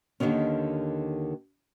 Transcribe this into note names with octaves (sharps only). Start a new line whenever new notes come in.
D#2 A#2 D3 D#3 C#4